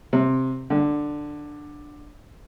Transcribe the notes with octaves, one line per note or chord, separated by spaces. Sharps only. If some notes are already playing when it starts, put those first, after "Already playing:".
C3
D3